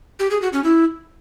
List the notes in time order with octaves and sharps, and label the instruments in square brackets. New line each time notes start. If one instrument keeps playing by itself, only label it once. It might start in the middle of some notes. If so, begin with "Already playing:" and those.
[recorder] G4
G#4
F#4
C#4
E4